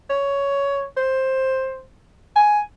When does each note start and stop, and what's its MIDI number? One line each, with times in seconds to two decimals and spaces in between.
0.10 0.84 73
0.97 1.82 72
2.36 2.60 80